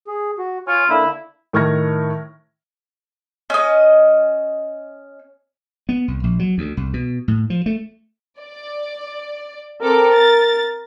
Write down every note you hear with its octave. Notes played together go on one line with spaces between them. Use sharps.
G#4
F#4
F4 C#5 G#5 C#6
D3 A#3 D4 E4
A2 D#3 C#6 F6 G#6 A#6
C#4 D#5
B3
C2
A#1
F#3
D2
C2
B2
A2
F3
A3
D5
C4 A4 A#4 D6
A6